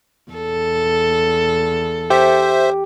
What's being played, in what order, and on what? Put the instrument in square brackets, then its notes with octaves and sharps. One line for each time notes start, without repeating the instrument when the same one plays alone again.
[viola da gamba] E2 A4
[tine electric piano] G4 [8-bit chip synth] C5 E5